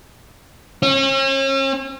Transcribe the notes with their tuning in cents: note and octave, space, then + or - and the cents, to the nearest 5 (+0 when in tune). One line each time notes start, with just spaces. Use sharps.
C#4 -40